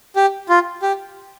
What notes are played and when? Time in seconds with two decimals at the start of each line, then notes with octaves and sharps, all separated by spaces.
0.16 G4
0.49 F4
0.82 G4